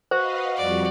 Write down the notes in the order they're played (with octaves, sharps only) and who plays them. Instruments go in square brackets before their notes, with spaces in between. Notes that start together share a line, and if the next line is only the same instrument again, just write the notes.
[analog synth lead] F#4 [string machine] B4 D#5 F5 [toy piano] C5
[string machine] F2 F3 G3 [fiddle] D5